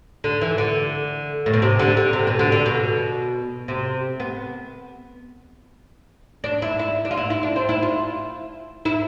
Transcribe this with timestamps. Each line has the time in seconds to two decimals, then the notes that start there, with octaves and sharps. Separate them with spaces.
0.24 D3
0.41 E3
0.58 D3
1.46 A2
1.54 B2
1.62 C3
1.79 D3
1.97 D3
2.13 C3
2.27 B2
2.39 D3
2.52 D3
2.66 B2
3.68 C3
4.20 B3
6.44 D4
6.62 E4
6.79 E4
7.05 D4
7.11 F4
7.17 E4
7.30 E4
7.43 D4
7.56 C4
7.69 E4
7.82 F4
8.85 E4